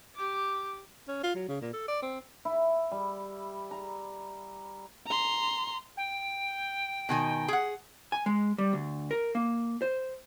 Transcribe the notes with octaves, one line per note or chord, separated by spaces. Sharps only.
G4 D6
C#4
F4
F#3
C#3
A#2
A4
D5
C4
E4
G3
A#5
A#5 C6
G5
B2 D#3 G#5
G#4 F#5
G#5
G#3
G3
D2
A#4
A#3
C5